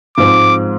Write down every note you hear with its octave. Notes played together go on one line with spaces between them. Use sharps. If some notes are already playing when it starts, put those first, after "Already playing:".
G#2 F3 G#3 C4 D6